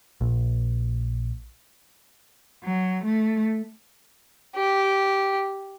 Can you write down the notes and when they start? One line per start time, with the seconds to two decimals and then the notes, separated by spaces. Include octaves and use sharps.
0.21 A#1
2.64 F#3
3.05 A3
4.55 G4